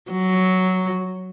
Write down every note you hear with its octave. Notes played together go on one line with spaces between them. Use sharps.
F#3